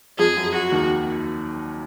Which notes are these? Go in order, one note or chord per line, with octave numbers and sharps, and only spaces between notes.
F2 F3 G#4
F#2 F#3
F#4
D#2 D#3